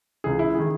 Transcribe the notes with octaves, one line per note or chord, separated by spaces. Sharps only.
C#2 C#3 E3 G#4
E4
D#3 G#4